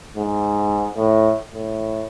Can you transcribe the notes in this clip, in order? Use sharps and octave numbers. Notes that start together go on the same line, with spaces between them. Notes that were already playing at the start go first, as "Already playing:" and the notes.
G#2
A2
A2